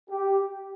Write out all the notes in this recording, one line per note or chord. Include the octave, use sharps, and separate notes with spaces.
G4